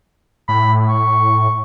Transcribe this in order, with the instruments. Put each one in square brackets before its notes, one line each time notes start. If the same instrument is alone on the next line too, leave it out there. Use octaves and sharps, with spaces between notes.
[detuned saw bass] A2 [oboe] B5
[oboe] C#6